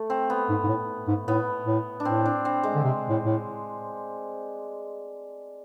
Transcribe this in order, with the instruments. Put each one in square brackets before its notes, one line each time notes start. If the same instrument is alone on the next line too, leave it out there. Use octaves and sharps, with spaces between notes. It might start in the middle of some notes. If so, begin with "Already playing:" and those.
Already playing: [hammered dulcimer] A3
C4
B3
[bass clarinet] G#2
G#2
A2
G#2
[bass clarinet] A2 [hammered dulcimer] B3
[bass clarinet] A2
[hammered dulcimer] D4
[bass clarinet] A2 [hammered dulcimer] C4
[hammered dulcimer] D4
C4
G#3
[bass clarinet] D3
C3
A2
A2